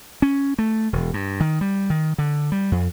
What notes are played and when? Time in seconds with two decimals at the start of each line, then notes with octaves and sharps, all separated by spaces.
0.22 C#4
0.58 A3
0.93 E1
1.14 G2
1.40 D#3
1.61 G3
1.90 D#3
2.18 D3
2.52 G3
2.72 F2